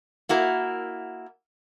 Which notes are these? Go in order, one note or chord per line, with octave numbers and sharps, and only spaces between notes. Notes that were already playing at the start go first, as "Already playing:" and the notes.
A#3 E4 F#4 A#4